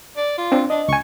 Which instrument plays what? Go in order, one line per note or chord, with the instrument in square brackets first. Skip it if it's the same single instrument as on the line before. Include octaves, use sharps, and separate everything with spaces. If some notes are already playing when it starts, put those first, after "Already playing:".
[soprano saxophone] D5
F4
[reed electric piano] C4 D4
[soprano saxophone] D4 [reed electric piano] D#5
[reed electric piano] C#2 G#5 [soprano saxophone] C#6